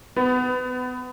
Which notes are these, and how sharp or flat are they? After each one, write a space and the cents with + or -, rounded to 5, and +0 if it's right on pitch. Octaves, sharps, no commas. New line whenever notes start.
B3 +25